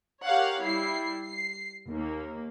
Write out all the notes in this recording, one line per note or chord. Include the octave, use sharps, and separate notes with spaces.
G4 A#4 C#5 F5 F#5
G3 E4 C7
C7
D#2 A#3